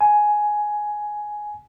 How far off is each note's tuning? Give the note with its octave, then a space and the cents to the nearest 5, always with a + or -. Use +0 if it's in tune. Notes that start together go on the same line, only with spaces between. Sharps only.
G#5 +10